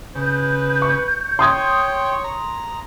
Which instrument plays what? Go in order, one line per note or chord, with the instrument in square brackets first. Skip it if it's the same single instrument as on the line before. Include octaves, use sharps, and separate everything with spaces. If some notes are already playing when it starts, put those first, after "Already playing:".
[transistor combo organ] C#3 [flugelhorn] B4 [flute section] G6
[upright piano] C#6
[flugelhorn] C#5 [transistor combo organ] G5 [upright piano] C6 D#6 G#6
[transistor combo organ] A#5